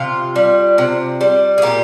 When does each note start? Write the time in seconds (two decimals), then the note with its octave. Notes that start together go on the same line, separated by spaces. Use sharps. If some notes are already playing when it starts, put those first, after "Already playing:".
Already playing: C3 F4
0.36 G3
0.78 C3
1.21 G3
1.58 G#4
1.62 A#2 G4